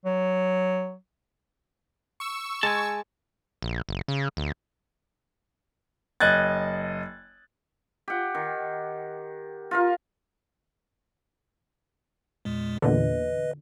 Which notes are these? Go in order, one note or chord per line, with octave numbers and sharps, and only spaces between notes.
F#3
C#6 E6
G#3 G#5 A5
A#1
F#1
C#3
D2
F#1 D#5 F#6 G#6 A6
G4 F#5
D#3
F4 A#4 F5
E2 A#2 G#3
E2 A#2 D3 B4 D#5